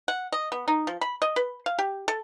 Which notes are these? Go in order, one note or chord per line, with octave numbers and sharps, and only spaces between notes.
F#5
D#5
B3
D#4
F3
B5
D#5
B4
F5
G4
A4